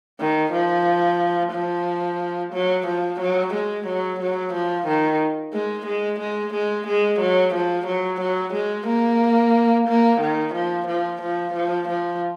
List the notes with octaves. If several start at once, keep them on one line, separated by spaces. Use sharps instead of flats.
D#3
F3
F3
F#3
F3
F#3
G#3
F#3
F#3
F3
D#3
G#3
G#3
G#3
G#3
G#3
F#3
F3
F#3
F#3
G#3
A#3
A#3
D#3
F3
F3
F3
F3
F3